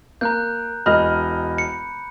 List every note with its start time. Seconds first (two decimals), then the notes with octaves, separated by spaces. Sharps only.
0.21 A#3 A#5 F#6 G6
0.86 E1 D#5 B5 F6
1.58 C#7